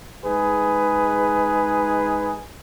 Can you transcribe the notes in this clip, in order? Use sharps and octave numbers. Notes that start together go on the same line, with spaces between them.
G#3 D#4 G#4 B4